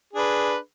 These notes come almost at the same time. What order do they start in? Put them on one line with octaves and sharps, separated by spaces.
G#4 D4 B4